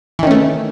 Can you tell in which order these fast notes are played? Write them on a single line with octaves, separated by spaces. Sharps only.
E3 D#3 C#4 A3